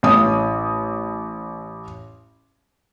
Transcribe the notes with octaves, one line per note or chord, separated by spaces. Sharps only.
A1 D#6